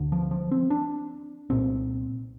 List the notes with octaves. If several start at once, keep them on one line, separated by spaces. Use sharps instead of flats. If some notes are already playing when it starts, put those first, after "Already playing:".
Already playing: D2 D3
F3
F3
C4
D4
C2 A#2 C4